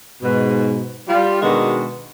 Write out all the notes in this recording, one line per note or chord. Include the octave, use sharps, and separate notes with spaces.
G#2 B2
G3 F4
B2 D#3 G#3 D4 F#4